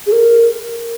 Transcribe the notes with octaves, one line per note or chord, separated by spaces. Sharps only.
G#4
A#4